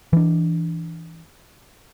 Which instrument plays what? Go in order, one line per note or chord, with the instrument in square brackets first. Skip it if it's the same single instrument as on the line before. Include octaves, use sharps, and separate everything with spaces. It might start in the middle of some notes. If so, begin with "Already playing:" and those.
[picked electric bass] E3 D4